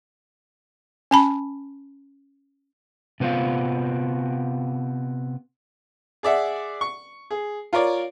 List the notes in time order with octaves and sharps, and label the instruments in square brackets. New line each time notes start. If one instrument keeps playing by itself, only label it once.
[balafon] C#4 A5 B5
[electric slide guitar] C3 B3 C4 F4
[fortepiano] G#4 D5 E5 F#5
C#6
G#4
F4 A#4 C#5 D5